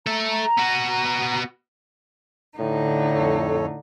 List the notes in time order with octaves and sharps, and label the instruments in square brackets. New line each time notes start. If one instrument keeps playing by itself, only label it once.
[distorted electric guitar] A4 E5 [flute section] A#5
[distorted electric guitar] B3 F#4
[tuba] A2 [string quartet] D3 D#4
[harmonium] F2 A4 C#5